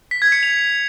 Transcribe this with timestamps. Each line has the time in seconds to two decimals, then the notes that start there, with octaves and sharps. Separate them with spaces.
0.11 B6
0.22 G#6
0.32 C#7
0.43 F7